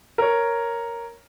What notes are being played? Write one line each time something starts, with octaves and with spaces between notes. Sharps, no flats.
A#4 C#5